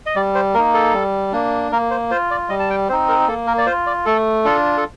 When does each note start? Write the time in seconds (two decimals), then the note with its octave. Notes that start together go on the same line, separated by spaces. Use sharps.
0.06 D#5
0.16 G3 D5
0.35 C5
0.54 A#3 D#4 A#4
0.74 A4
0.94 G3
1.32 A#3 D4
1.72 A#3 A#4
1.91 C5
2.11 F4 C5
2.31 D5
2.49 G3 D#5
2.60 A5
2.70 G5
2.89 C4 D#4 C5
3.08 A#4
3.28 A#3 A4
3.47 A#4
3.58 D5
3.66 F4 C5
3.87 D5
4.06 A3 A4
4.45 D4 F4 A4
4.77 A4